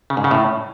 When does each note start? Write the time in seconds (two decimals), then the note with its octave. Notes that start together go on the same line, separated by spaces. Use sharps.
0.10 C#3
0.17 G#2
0.24 C#3
0.31 A2